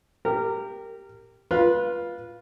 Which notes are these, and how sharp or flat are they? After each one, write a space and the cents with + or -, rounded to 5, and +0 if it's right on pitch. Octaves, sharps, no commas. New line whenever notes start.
G4 +0 A#4 -20
F4 +0 B4 -20